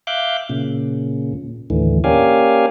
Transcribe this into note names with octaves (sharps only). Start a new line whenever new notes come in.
E5 F5 D6 F#6 G6
A#2 C#3
D#2 A2 D3 E3
A#3 C#4 G4 D5 F5 G#5